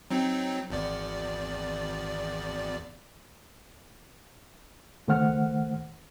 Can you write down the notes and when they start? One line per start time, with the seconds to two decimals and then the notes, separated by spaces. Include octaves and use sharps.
0.11 F#3 C4 D#4
0.70 G#1 E2 D5
5.08 C#2 D#3 A3 C5 F#5 F6